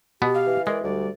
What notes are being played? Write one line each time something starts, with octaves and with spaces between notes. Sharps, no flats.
B2 B3 G4
F5
E3
G#3 A#4 D5
D2 G3 D5